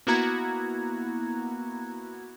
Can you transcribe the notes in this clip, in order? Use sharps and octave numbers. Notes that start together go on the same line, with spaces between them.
A#3 B3 E4 F#4 A#5 G#6